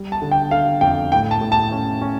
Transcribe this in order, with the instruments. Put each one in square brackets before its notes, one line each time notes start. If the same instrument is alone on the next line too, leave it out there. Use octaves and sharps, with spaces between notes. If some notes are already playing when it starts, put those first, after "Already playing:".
Already playing: [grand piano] G3
A5
D3
G5
D3 F5
F2 G5
A2 G5
A5
A2
A5
C#4
C#4